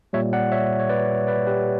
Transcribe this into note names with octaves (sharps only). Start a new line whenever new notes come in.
A#2 G3 C#5 E5
D5 F#5
C#5 E5
C#5
B4 D5
B4 D5
G4 B4